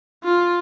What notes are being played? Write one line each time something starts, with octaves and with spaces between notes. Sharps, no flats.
F4